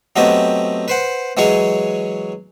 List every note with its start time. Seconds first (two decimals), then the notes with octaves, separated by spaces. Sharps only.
0.16 F#3 A3 B3 C4 G4 D#5
0.88 B4 C5 F#5
1.37 E3 F#3 G#3 G#4 C#5